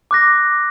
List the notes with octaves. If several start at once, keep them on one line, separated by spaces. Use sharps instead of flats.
D6 F#6 A#6